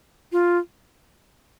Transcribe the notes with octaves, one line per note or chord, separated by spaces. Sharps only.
F4